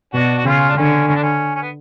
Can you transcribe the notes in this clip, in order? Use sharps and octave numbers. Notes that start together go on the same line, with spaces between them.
B2 D4 F#4
F#4
C#3 C#4 F4
D4
D3 C#4
C#4
D4
C#4
C#4
B3